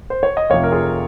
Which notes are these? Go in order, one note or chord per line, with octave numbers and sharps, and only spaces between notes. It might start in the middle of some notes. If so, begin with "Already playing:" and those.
C5
C#5
D#5
F1 F2 C3 C#5 F5
A#4
F4 G#4